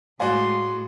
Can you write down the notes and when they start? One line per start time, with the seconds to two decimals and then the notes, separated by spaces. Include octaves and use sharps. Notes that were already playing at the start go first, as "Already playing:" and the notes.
0.20 A2 G#3 F#4 D5 F5 G#5 C6